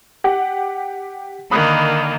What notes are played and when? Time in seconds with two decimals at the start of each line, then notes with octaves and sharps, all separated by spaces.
0.24 G4 F#5
1.51 D3 D#3 A#3 B5 D#6 F#6